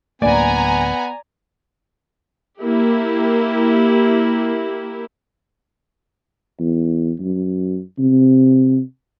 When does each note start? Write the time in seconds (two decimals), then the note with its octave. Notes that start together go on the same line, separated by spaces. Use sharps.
0.22 D1 D2 A#3 B3 D5 G#5 A#5
2.61 A#3 E4 G4
6.60 E2
7.20 F#2
7.99 C3